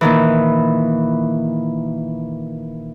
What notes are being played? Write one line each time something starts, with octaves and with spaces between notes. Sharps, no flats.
A#2 D#3 E3